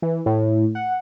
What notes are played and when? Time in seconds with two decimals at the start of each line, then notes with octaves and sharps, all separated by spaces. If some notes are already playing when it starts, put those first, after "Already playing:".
0.02 E3
0.26 A2
0.75 F#5